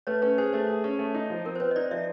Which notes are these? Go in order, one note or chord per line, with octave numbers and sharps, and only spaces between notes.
A3 B4 C#5
C#4 B4 C#5
G#4 C5
A3 C5
G#4
C#4
A3
D#4
F3
C4 A#4
C5
C4 B4 C#5
D#5
D#4 C5 D5
F3 D5 E5